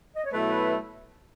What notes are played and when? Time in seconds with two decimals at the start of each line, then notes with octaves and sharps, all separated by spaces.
0.16 D#5
0.25 C#5
0.32 B2 F#3 A3 E4 B4
0.48 B4